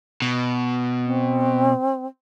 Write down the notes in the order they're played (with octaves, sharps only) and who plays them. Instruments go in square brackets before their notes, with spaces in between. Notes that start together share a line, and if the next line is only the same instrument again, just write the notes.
[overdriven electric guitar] B2
[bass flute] C4